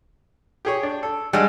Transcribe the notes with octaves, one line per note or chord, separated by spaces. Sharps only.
G4 G#4 C#5
D4
A4
G3 G#3 D4 F#5 E6